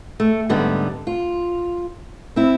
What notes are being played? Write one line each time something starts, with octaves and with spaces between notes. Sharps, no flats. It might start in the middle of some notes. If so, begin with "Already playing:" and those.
A3
G#2 D3 G3 B3
F4
C4 E4